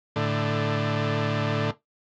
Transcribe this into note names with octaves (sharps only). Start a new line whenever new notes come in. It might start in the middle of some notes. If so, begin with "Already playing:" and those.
A2 D3